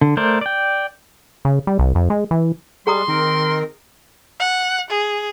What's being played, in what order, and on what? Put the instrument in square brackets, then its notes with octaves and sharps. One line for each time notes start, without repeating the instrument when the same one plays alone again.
[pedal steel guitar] D3
A3 A#4 C5 D5
D5 G5
[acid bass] C#3
G3
C2
F2
G#3
E3
[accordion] G3 G#3 [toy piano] G#4 A#5 D#6 [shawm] C6
[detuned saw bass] D#3 [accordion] C4 A#4
[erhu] F#5
G#4